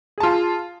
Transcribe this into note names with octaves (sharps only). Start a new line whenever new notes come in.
F4 G#4 A5